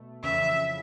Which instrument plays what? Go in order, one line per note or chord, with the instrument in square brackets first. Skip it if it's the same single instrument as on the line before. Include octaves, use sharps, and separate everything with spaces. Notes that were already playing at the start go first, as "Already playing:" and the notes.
Already playing: [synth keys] B2 A3
[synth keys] F2 C#3 E3 [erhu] E5